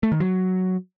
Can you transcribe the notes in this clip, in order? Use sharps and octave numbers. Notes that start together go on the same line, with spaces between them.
A3
D#3
F#3